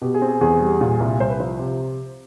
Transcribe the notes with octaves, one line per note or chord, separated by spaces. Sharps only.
B2 G4
G#4
C4
G#4
E2 G#4
G3
A#2
C2
C2 C5
B4
F3 C5
C3